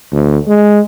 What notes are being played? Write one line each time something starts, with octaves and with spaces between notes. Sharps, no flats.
D2
G#3